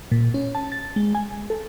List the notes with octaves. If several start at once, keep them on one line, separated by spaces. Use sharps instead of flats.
A#2
C#4
A5
A6
G#3
G#5
A4